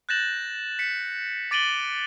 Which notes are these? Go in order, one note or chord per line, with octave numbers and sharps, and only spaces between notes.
F#6 G6 A6 A#6 E7 F#7
B6 C#7
D6 A6 D7 D#7 F#7 G7